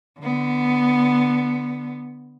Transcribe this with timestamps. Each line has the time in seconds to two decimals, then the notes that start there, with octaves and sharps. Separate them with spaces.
0.20 D3 B3